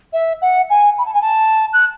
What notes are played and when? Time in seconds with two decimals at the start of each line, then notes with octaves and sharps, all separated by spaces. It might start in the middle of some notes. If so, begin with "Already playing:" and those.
0.13 E5
0.41 F#5
0.70 G#5
0.98 B5
1.05 A5
1.14 G#5
1.21 A5
1.73 F#6